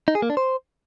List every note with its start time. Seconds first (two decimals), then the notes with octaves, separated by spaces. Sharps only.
0.08 D#4
0.15 G#4
0.22 A#3
0.30 D4
0.37 C5